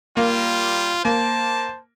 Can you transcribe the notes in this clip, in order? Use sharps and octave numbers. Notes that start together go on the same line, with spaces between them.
G3 A#3 F4
A#3 C5 A5